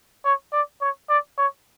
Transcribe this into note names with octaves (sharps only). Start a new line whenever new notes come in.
C#5
D5
C#5
D5
C#5